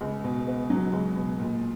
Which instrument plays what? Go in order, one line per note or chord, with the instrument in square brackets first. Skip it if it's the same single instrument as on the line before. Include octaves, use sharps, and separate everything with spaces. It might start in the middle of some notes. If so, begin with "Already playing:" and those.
[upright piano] C#2
B2
B3
F#3
C#2
B2
A#2